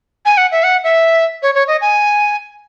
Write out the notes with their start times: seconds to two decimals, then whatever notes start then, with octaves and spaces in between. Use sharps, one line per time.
0.25 G#5
0.37 F#5
0.52 E5
0.64 F#5
0.84 E5
1.43 C#5
1.55 C#5
1.68 D#5
1.81 G#5